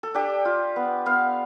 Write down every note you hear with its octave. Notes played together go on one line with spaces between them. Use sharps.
A4
D4 G4
F4
B3
B3 F5